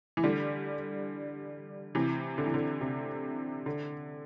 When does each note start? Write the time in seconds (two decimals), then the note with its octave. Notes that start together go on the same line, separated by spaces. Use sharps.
0.17 E3
0.24 D3 G3
1.95 C3 E3
2.38 D3
2.46 E3
2.54 D3
2.81 C3
3.66 D3